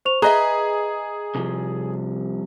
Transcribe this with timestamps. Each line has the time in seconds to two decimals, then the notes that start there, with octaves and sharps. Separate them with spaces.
0.05 C5 C#6 F7
0.22 G#4 B4 D#5 E5 A#5
1.35 C2 C3 F3